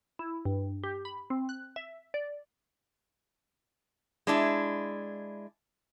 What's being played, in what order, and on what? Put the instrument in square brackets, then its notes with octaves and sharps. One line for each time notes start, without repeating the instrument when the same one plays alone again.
[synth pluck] E4
G2
G4
B5
C4
F#6
E5
D5
[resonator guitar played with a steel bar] G#3 D4 E4